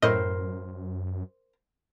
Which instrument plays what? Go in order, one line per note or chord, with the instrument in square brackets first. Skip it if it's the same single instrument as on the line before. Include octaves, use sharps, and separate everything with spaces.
[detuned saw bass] F#2 [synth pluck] A2 D#5 [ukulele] A#4 C5